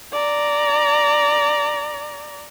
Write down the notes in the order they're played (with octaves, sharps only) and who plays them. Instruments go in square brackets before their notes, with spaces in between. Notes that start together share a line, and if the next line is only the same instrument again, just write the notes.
[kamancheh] D5 A#5